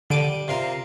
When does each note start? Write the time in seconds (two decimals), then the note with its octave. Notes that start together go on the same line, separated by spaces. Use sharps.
0.10 D3 G3 D6 D7 D#7
0.48 C3 F4 A#4